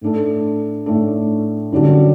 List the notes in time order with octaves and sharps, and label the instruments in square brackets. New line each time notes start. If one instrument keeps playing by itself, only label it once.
[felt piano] A2 A3 D4 A4
A2 A3 D4 A4
F#2 D3 G3 D4 F#4